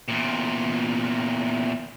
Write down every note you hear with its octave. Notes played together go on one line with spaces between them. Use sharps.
E2 A#2